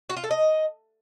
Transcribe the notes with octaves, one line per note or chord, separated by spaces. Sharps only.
F#4
F4
A4
D#5